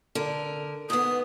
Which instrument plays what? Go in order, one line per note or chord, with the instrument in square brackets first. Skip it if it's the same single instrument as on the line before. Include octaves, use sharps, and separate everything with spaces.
[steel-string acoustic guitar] D3 A#4
[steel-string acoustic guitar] G#2 B3 [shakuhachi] D#6